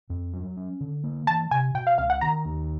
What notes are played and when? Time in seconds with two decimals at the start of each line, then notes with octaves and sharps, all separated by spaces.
0.10 F2
0.33 F#3
0.57 C#4
0.81 D3
1.04 A#3
1.27 E3 A5
1.51 C3 G#5
1.74 B2 G5
1.87 F5
1.98 C#2 F5
2.10 F#5
2.21 D#3 A#5
2.45 D#2